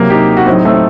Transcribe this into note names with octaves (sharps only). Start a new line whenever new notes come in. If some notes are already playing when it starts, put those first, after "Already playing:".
Already playing: C3 F#3 A#3
D#4 G4
F#4
A2 F#3 C4 D#4
A3 C4